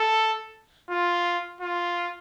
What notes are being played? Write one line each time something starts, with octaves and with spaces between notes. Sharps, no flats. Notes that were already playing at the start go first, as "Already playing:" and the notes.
Already playing: A4
F4
F4